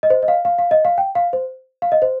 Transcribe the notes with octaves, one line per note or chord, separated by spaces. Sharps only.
D#5
C5
D#5
F5
F5
F5
D#5
F5
G5
F5
C5
F5
D#5
C5